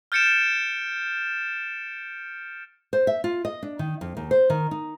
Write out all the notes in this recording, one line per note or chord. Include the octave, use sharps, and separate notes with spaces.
F6 G6 A6 C#7 D7 E7
C5
E5
F4
D#5
D4
D#3
F2
D#2
C5
D#3
D#4